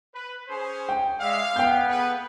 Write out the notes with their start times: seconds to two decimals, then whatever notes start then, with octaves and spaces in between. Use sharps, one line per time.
0.14 B4
0.47 C#4 G#4 C5
0.89 G5
1.20 G#3 D5 E5 F5
1.56 B3 G5 G6
1.89 G#4 A4 B4